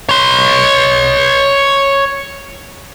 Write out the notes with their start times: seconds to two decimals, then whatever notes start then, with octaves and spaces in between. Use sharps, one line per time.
0.09 C#5 C6